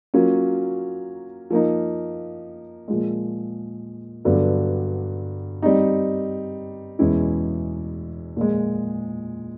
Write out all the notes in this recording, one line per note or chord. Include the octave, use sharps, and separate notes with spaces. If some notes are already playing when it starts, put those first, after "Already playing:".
F#3 A#3 C#4 F4
F3 A#3 D#4
A#2 F3 G#3
G2 D3 F#3 B3 D4
G3 C4 D#4
E2 B2 G#3 C#4 E4
A#2 F3 G#3